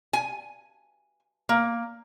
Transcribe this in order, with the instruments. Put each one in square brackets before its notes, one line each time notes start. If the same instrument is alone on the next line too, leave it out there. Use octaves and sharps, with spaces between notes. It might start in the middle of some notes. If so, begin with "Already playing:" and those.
[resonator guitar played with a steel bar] G#5
A#3